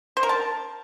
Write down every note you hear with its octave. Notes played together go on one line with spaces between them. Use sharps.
C5
A#4
A5